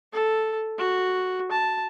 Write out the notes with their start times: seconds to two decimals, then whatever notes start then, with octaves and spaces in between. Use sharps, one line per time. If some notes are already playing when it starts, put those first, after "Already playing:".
0.13 A4
0.79 F#4
1.52 A5